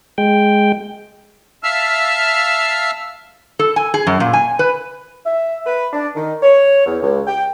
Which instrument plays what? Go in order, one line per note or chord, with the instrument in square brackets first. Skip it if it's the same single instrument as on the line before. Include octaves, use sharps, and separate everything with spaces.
[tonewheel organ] G#3 G5
[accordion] E5 F5 A5 E6 F6
[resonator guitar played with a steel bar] A4
G#5
G#4
F#2
A#2
G#5
B4
[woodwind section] E5
B4
D4
D#3
C#5
E2
C#2
G5